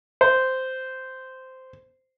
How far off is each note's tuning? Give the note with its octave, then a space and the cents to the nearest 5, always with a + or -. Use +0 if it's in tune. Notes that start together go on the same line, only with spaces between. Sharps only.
C5 -10